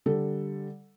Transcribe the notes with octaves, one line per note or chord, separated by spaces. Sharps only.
D3 G3 A4